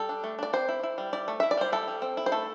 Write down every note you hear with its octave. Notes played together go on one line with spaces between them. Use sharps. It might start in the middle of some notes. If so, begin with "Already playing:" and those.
Already playing: G3 A4
D4
A3
D4 D5
C4 C5
E4
E4
G3
E4 D5
A3
E4 E5
D5
G3 C5
E4 A4
G3
C4
E4
C5
A3 A4